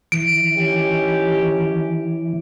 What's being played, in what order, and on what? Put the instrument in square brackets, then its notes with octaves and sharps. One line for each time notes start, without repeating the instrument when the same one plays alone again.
[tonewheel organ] E3 [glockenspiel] D7
[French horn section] C#4 D#4 G4